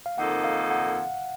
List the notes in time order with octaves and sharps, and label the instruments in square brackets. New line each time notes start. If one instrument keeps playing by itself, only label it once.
[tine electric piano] F5
[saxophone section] F2 D#3 A#3 D#4 A4 [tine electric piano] F#5
[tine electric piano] F5
F#5